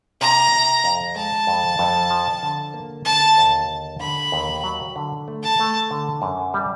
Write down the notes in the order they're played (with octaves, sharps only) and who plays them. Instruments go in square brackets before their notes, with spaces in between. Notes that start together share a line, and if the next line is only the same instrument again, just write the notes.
[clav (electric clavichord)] C3 [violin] A#5
[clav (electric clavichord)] C3
F2
[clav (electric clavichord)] G#3 [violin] A5
[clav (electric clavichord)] F2
F2
F3
D3
A#3
[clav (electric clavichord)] D3 [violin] A5
[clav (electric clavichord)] D#2
D3
[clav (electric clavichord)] D3 [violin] B5
[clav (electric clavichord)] D#2
F#3
D3
A3
[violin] A5
[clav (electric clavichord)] A3
D3
F#2
G3